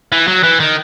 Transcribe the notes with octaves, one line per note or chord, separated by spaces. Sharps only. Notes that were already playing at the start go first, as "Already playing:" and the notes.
E3
F#3
E3
D#3